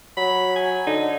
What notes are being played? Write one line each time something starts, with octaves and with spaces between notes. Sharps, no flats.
F#3 B5
G#5
D3 D#4